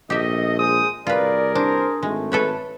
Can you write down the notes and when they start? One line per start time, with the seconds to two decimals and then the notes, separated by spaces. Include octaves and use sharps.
0.10 A#1 A3 G4 D#5 E5
0.58 G#3 C5 D#6
1.07 C2 F4 G#4 A#4 B4 D5
1.55 D4 C5
2.03 G#1 G#3 A3
2.32 A4 B4 C#5